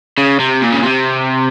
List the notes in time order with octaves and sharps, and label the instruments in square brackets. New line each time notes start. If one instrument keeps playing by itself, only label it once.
[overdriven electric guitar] C#3
C3
A#2
C#3
C3